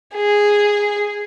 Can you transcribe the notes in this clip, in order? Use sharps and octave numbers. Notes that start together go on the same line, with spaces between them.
G#4